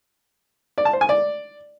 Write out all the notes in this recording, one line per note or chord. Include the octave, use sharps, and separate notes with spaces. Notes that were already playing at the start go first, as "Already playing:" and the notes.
D5
A5
C5
G#5
D5